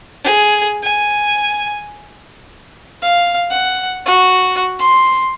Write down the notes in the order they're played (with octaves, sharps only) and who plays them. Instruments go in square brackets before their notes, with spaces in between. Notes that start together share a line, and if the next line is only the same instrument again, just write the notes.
[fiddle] G#4
G#5
F5
F#5
F#4
C6